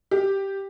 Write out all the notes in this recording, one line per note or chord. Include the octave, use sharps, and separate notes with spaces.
G4